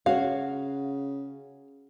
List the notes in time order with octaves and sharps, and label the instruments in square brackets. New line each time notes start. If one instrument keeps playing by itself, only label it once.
[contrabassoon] C#3 [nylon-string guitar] F#4 C#5 [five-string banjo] F5